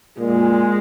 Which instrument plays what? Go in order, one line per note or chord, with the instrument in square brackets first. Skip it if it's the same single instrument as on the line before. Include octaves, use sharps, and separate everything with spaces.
[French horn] A#2 [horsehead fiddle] G#3